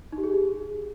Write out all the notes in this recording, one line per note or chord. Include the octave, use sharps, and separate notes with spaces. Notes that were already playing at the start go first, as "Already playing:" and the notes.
D#4
G4
G#4